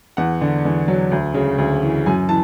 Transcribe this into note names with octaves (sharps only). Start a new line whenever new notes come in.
E2 F#5
D3
E2
F#3
D2
C#3
D2
E3
F#2 G#5
E3 A5